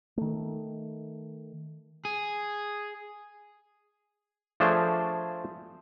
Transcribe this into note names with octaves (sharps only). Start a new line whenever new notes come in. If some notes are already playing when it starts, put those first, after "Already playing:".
D#3 A3
G#4
F3 A3 D4 G#4 C5 C#5